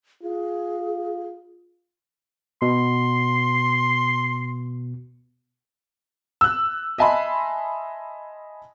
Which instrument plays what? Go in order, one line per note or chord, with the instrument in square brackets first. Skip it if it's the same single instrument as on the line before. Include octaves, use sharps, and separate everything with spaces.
[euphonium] F4 [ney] G#4
[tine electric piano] B2 [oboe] C6
[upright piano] E6 F#6
D#5 E5 G#5 A5 B5 C6